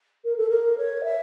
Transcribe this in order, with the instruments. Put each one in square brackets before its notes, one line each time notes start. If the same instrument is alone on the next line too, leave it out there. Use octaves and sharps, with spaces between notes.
[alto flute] A#4
A4
A#4
C#5
E5